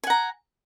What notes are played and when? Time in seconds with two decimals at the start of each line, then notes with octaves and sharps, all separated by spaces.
0.04 G#5
0.07 F#5
0.10 A#5